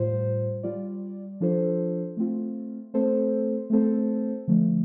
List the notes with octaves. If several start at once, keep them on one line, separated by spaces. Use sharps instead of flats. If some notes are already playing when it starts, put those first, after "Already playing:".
Already playing: A2 G3 F4 C5
G3 F4 D5
F3 D4 F4 A4 C5
A3 C4 F4
A3 C4 A4 C5
A3 C4 A4 C5
D3 F3 A3